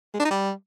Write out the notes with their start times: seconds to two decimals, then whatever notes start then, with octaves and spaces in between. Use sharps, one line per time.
0.14 G#3
0.19 D4
0.25 D#4
0.31 G3